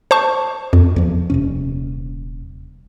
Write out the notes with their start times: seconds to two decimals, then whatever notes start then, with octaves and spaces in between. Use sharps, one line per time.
0.11 C5 A5 C#6
0.73 F2
0.96 E2 F3
1.30 D#1 C3 C#4